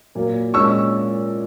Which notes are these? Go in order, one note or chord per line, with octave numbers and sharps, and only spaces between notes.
A#2 F#3 A#3
A#2 G#3 C#4 C#6 E6